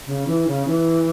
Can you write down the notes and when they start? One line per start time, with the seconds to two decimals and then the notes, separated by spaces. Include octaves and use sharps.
0.06 C#3
0.27 E3
0.47 C#3
0.67 E3